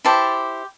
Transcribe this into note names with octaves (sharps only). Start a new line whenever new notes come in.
E4 G4 C5 A5